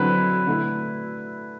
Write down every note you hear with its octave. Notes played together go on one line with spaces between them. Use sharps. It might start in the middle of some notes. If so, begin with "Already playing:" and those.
Already playing: D3 F#3 C4 E4 B4
D3 A3 E4